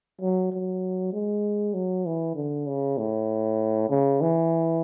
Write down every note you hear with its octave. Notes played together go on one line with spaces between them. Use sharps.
F#3
F#3
G#3
F#3
E3
D3
C#3
A2
C#3
E3